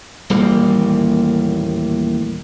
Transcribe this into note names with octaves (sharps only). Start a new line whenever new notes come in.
D#1 A1 G3 A#3